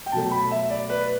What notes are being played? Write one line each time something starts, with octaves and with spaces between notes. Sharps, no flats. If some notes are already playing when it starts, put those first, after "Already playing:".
G5
B2 F#3 A3 A5
B5
E5
D5
B4